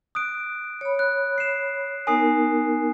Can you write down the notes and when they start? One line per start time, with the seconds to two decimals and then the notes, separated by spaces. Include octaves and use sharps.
0.15 D#6 F#6 D7
0.81 C#5 B5
0.99 F#6
1.38 C7 E7
2.07 B3 D#4 A#4 G#5 D#6 C7